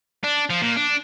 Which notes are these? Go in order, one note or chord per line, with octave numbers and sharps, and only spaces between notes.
D4
F3
A#2
D4